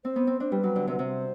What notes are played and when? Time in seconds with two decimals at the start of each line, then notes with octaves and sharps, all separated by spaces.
0.04 C4 C5
0.16 B3
0.27 C4
0.40 D4 C5
0.51 G3 B4
0.63 F#3
0.76 D3
0.87 C3 B4
0.99 C3 C5